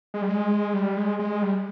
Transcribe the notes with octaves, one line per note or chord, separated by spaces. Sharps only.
G#3
G3
G#3
G3
G#3
G#3
G3